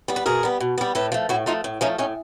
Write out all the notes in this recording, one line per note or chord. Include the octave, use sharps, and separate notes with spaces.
G3 B3
B4
B2 G#4 A#4
G3 B3
B2
G3 B3
A2 A4 B4
F3 A3
A2 E4 F#4
F3 A3 D#4 F4
A2
F3 A3 C#4 D#4
A2 C#4 D#4